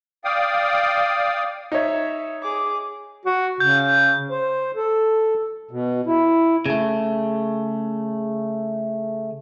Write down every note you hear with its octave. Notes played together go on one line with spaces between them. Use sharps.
D5 F5 G5 D#6
D#4 C#5 E5
G#4 D6
F#4
C#3 G6
C5
A4
B2
E4
C#3 A3